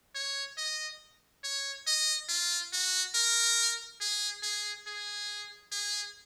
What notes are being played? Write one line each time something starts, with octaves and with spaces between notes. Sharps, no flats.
C#5
D#5
C#5
D#5
F4
F#4
A#4
G#4
G#4
G#4
G#4